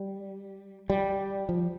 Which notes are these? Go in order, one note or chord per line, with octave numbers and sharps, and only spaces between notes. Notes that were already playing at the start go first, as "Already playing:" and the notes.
Already playing: G3
G3
F3